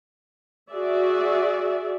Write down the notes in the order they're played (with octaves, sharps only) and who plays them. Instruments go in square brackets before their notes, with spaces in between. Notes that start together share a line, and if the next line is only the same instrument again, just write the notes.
[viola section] F#4 G#4 D5 E5